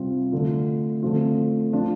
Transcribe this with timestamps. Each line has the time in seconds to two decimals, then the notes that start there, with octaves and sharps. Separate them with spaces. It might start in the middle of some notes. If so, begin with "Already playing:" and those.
Already playing: C3 G3 C4 F4
0.32 D3 A3 F4
1.03 D3 F3 A3 C4 F4
1.72 F3 D4 F4